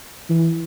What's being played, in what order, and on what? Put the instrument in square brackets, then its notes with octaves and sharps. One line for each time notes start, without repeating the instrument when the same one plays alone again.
[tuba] E3